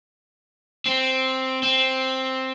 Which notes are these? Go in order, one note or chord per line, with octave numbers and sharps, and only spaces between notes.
C4
C4